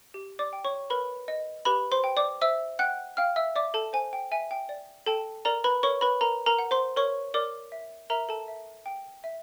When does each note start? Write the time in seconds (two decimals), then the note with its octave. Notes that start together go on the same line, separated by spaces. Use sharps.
0.14 G4
0.39 D5 D6
0.53 G5
0.65 C#5 C#6
0.90 A#4 B4 B5
1.28 D#5
1.65 G4 B4 B5
1.92 C5 C6
2.04 G5
2.17 D5 D6
2.41 C5 E5 E6
2.79 F#5 G5 F#6
3.17 F5 G5 F6
3.36 E5 E6
3.56 D5 E5 D6
3.74 A4 A5
3.93 C5 G#5
4.13 G5
4.32 E5 G#5
4.51 G5
4.69 D5
5.06 A4 G5 A5
5.45 A#4 D5 A#5
5.64 B4 B5
5.83 A#4 C#5 C#6
6.01 B4 B5
6.21 A#4 A#5
6.46 A#4 A#5
6.59 F#5
6.71 C5 C6
6.96 A#4 C#5 C#6
7.34 A#4 D5 D6
7.72 E5
8.10 A#4 E5 A#5
8.29 A4 A5
8.48 E5
8.86 G5
9.24 E5